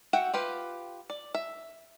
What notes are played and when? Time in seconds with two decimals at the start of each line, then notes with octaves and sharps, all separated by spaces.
0.13 F#4 E5 F#5 G5
0.34 F4 G4 B4
1.10 D5
1.35 E5